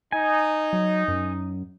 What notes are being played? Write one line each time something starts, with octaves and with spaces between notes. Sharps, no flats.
D#4 G#5
F#3
F#2